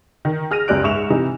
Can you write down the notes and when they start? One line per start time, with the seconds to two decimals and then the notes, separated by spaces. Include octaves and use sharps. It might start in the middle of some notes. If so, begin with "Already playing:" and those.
0.25 D#3
0.51 G#4 F6 A#6 D#7
0.68 C#2 F#2 G4 D5 F#6 D7
0.83 G#2 E5 C#6 E7 F7
1.10 C3 E3 G3 D#4